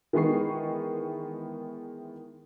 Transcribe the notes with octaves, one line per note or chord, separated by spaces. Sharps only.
D#3 E3 G#3 B3 C#6 C7